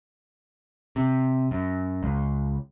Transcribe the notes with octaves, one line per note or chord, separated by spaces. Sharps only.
C3
F#2
C#2